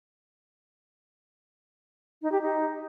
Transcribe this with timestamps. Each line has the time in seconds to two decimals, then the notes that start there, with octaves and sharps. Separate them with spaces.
2.22 D#4
2.32 G4
2.41 D#4